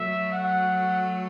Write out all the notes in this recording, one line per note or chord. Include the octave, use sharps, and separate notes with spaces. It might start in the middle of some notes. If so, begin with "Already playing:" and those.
Already playing: F#3 A3 E5
F#5